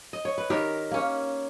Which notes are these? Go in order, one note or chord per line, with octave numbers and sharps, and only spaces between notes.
D#5
C#5
B4
D#3 G4 A#4
A#3 C#4